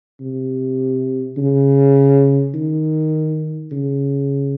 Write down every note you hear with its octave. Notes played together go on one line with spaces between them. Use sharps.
C3
C#3
D#3
C#3